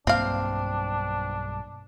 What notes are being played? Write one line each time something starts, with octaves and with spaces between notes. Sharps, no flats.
B1 G2 A#3 C4 D4 F5